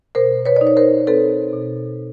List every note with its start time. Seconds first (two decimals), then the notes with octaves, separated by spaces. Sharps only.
0.15 B2 A#4 C5
0.45 B4 C#5
0.56 D5
0.61 D#4
0.67 C#5
0.77 A#4 C5
1.07 C4 A4 B4
1.53 B2